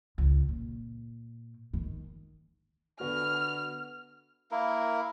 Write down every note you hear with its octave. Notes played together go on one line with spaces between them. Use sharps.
C#2
A#2
D#3
D3 B3 F#4 F6
A#3 E4 A#4